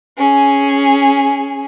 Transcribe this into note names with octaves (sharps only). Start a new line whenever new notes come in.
C#4 G#4